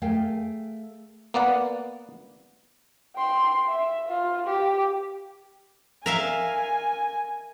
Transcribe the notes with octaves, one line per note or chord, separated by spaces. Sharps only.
A3 G#4 A#4 F5 G5 G#5
A#3 B3 D5 F#5
G5 C6
E5
F4
G4
A#4 E5 F5 G#5